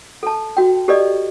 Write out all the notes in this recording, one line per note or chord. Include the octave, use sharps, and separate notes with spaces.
A4 A5
F#4 G5
G4 A4 B4 D5 D#5